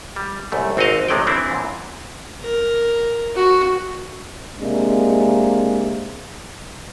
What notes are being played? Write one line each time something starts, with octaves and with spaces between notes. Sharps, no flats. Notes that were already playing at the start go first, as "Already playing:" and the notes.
G3
C2 F#2 A3
G#1 C4 F#4 G4 D#5 F5
A1 C3 G#3 A3 D5 G5
E3 C4 D4 E4
F#2 A#2
A#4
F#4
C3 G#3 A#3 D4